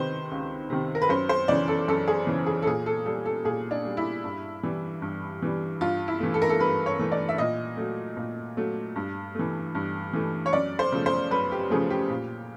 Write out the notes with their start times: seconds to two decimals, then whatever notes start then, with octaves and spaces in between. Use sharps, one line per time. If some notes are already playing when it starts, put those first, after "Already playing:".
Already playing: C3 D#3 B4 C5
0.31 C#2
0.70 C3 D#3
0.95 A#4
1.02 B4
1.09 F#2 C5
1.29 C5
1.48 C#3 E3 D5
1.68 A4
1.88 F#2 A4
2.08 G#4
2.27 C#3 E3
2.46 G#4
2.62 A4
2.66 A#2 G#4
2.86 A4
3.06 G3 A4
3.26 A4
3.45 A#2 G#4
3.71 D4
3.85 G3
3.97 E4
4.24 G2
4.63 E3 G3
5.02 G2
5.42 E3 G3
5.81 G2 F4
6.08 E4
6.20 E3 A3
6.34 A4
6.42 A#4
6.49 A4
6.59 G2 B4
6.86 C#5
6.99 E3 A3
7.12 D5
7.29 E5
7.38 A#2 D#5
7.77 F#3 A3
8.17 A#2
8.57 F#3 A3
8.96 G2
9.35 E3 A3
9.75 G2
10.13 E3 A3
10.46 C#5
10.53 F#2 D5
10.79 C5
10.92 C#3 F3 A3
11.06 C5
11.31 F#2 B4
11.52 G4
11.70 C#3 F3 A3 G#4
11.90 G4
12.10 A#2